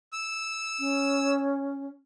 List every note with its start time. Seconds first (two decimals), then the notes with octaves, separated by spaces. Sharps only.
0.13 E6
0.79 C#4